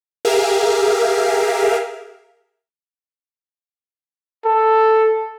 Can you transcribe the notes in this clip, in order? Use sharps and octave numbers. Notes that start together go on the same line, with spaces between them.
G4 G#4 A#4 E5 F5
A4